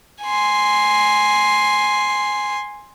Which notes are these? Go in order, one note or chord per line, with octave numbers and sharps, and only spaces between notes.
G#5 C6